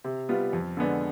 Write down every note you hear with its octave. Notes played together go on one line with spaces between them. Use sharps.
C3
G3 B3 F4
F2
D3 G#3 B3 D4